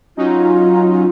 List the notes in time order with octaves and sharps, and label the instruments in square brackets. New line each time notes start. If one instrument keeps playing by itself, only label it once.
[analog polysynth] F#3 C#4 D#4 [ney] F4